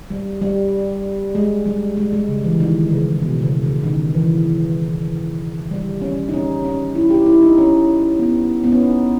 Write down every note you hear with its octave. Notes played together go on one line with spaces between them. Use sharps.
G3
G3
G#3
G3
G#3
G#3
C#3
E3
D#3
C#3
B2
C#3
C#3
D#3
E3
G3
C#4
D#4
C#4
C#4
E4
G4
E4
D#4
C#4
B3
B3
C#4
D#4